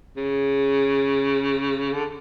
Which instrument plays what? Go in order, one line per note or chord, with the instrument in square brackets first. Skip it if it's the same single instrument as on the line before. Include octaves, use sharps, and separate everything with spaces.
[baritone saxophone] C#3
D3